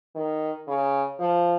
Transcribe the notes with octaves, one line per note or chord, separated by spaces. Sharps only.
D#3
C#3
F3